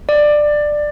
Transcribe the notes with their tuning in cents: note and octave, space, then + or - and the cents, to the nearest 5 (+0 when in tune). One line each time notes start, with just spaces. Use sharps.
D5 +15